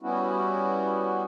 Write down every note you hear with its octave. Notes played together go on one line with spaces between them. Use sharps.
G3 B3 C#4 E4 F#4